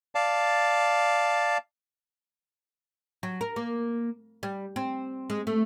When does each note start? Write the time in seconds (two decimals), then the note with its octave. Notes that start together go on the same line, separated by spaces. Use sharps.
0.15 D5 F5 A5
3.23 F#3
3.41 A#4
3.56 A#3
4.43 G3
4.76 C4
5.30 G#3
5.47 A3